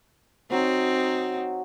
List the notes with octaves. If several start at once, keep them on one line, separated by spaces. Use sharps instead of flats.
F#3 C4 D#4 E6